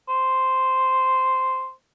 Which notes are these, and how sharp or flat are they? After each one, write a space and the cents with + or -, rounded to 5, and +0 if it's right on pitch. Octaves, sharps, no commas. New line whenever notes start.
C5 -5